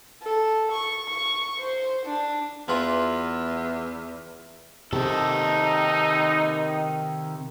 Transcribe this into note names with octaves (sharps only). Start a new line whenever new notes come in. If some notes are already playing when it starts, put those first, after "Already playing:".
A4
C#6
C#6
C5
D4
E2 E3 F4
C3 D#3 D#4 A4